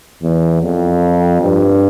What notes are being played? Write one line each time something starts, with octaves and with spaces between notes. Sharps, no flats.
E2
F2
G2